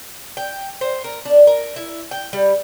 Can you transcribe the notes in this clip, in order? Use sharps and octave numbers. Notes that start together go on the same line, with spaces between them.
G5
C5
A#4
D4
A#4
E4
G5
G3